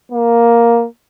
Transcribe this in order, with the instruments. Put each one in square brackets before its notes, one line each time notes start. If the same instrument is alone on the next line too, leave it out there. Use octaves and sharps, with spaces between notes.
[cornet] A#3